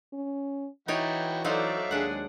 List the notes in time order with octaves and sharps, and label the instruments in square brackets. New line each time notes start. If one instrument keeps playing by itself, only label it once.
[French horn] C#4
[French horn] E3 [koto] D#4 C#5 D5 [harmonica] E4 F#4 G5
[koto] F#3 D#4 C5 [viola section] F#4 A4 D5 [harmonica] E5 F5
[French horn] D#2 [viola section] G#3 G#4 [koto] D4 F#5